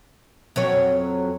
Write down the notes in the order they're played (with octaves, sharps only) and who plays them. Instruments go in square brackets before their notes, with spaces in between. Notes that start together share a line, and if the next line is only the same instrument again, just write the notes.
[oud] F2 F#3 C#5